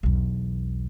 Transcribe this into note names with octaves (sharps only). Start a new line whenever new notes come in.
B1 E2